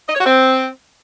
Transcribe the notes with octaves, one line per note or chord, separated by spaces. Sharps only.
D#5
C#5
F#4
C4